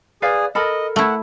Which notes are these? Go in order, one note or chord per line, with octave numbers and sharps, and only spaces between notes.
G#4 B4 D5 F5
A4 A#4 D#5 B5
A3 E4 F#5